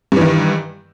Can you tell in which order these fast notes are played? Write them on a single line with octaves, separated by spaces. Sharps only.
G2 E3 D#3